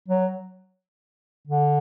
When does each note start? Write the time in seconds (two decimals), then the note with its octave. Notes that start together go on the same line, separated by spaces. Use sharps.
0.08 F#3
1.48 D3